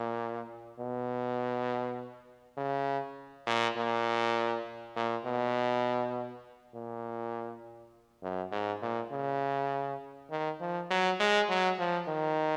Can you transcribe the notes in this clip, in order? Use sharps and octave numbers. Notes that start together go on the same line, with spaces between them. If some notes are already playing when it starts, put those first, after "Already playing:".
Already playing: A#2
B2
C#3
A#2
A#2
A#2
B2
A#2
F#2
G#2
A#2
C#3
D#3
F3
F#3
G#3
F#3
F3
D#3